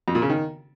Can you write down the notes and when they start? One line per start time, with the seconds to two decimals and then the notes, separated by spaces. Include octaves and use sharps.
0.08 F2
0.15 A#2
0.22 C#3
0.29 D#3